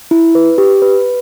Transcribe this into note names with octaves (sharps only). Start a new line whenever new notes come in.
E4
B4
G4
B4